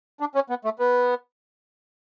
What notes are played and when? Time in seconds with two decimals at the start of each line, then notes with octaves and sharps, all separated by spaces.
0.20 D4
0.35 C#4
0.50 B3
0.65 A3
0.79 B3